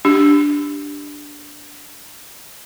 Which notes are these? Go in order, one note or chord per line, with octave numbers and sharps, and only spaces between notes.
D4 G4